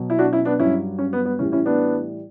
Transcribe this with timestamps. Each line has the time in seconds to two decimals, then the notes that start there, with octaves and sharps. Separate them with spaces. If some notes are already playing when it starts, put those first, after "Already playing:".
Already playing: B2 F#3
0.10 E4
0.18 D4 F#4
0.33 C#4 E4
0.45 B3 D4
0.59 G2 F#3 C#4 E4
0.99 C#4
1.13 B3
1.25 B3
1.39 A2 E3 G3 C#4
1.52 C#4 E4
1.66 B3 D4